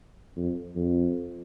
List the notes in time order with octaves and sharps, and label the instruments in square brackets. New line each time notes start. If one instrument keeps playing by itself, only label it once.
[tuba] F2
F2